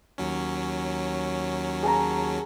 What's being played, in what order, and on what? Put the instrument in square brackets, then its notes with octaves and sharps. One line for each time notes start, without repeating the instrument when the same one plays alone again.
[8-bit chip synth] D#2 F#3 C#4
[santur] G#4 A5 A#5